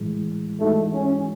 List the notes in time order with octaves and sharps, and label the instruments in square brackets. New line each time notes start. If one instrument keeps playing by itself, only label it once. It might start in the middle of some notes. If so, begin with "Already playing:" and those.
Already playing: [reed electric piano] A2 E3 G#3
[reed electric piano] E3 G#3 D#4 F#4 [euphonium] A3
[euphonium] C#4